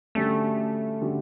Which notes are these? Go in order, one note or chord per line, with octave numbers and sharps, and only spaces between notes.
D3 G3 A3 C#4 F#4
D3 G3 C#4 F#4